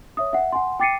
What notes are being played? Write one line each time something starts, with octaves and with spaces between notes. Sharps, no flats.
C#5 E5 D#6
E5 F#5
F#5 G#5 C6
G5 D6 A6 C7 C#7 D#7